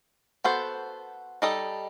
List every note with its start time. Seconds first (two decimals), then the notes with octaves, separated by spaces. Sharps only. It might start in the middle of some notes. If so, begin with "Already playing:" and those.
0.44 B3 F#4 A4 C5
1.42 G3 D#4 A4 D#5